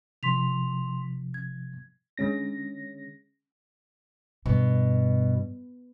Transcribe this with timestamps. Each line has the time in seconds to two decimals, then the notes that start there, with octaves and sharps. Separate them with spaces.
0.23 C3 F3 C6 B6 F7
1.34 G#6
2.17 D3 G#3 C#4 A#6
4.46 G2 B2